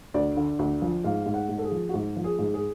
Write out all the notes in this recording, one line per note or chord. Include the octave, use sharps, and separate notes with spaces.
D2 D5
D3
D2
F3
G#2 F5
G#2
F#5
G#2
A4
G#4
F3
F#4
G#2 G#4
F3
G#4
G#2
G#4